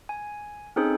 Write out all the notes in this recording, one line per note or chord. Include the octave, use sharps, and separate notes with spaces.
G#5
C4 C#4 D#4 G#4 A4 C5